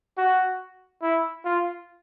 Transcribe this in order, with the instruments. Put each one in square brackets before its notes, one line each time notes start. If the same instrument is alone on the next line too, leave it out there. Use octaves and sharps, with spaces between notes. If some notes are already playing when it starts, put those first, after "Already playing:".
[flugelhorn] F#4
E4
F4